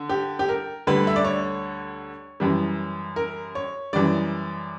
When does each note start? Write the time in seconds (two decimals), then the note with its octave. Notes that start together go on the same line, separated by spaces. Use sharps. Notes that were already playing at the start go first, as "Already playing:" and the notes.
Already playing: D3
0.09 G4
0.39 G4
0.49 A#4
0.87 D2 D3 G3 B4
1.07 E5
1.16 D5
1.25 C#5
2.40 F#2 E3 G3
3.16 A#4
3.55 C#5
3.93 F#2 E3 G3 D5